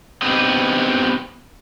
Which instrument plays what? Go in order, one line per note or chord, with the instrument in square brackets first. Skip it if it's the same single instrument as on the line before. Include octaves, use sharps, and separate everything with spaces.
[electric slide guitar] B3 C4 D4 D#4 G4 B4